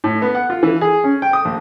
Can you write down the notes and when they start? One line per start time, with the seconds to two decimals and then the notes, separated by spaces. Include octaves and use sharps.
0.04 A2
0.22 B3
0.35 F#5
0.50 F4
0.63 E3
0.81 G#4
1.04 C#4
1.22 G5
1.33 D#6
1.45 A#1